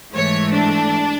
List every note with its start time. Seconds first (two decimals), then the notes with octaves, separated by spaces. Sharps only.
0.15 G#2 E3 A3 C#5
0.53 D4